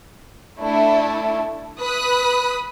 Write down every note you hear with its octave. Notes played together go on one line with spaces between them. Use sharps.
A3 D4 E4
B4 B5 D#6 F#6